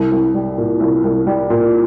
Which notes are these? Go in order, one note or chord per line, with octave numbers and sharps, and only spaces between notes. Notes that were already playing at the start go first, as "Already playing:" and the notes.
Already playing: C2
C2
G3
A#2
C2
C2
G3
A#2